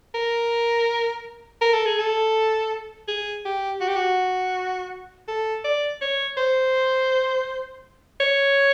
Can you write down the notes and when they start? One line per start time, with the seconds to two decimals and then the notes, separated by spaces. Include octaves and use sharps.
0.14 A#4
1.61 A#4
1.73 A4
1.86 G#4
1.99 A4
3.08 G#4
3.45 G4
3.81 F#4
3.88 G4
3.96 F#4
5.28 A4
5.65 D5
6.01 C#5
6.37 C5
8.20 C#5